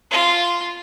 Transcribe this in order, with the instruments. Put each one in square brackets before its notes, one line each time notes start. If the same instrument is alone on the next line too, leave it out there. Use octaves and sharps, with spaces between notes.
[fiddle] F4